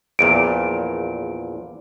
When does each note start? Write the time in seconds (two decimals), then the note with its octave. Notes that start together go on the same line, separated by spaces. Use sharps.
0.19 A#1 E2 A#2 D7